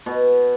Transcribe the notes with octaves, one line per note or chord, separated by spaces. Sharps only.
B2